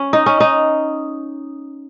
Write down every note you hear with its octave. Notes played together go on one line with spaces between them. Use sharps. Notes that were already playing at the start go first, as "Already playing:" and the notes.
Already playing: C#4
D#4
C#4
D#4